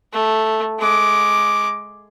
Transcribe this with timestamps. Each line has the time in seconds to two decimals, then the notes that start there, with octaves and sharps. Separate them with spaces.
0.13 A3
0.80 G#3 D6